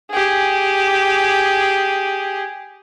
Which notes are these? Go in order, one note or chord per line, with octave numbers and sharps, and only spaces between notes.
G4 G#4